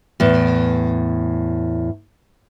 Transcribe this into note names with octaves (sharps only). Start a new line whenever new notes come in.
E2 A2